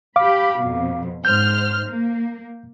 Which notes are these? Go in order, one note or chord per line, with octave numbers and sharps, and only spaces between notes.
G4 F5 B5 D6
F2 B2
G#2 C5 F6 G6
A#3